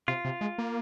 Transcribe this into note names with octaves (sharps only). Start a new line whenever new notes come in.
C3 F4
C3
G#3
A#3